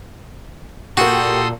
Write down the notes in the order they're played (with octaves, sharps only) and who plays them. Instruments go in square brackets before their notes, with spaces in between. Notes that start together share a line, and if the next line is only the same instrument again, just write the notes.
[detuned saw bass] A#2 [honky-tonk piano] A#3 G4 [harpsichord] F#4 [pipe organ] A4 C6 D#6